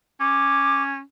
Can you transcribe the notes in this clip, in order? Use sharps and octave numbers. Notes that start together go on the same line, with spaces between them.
C#4 D6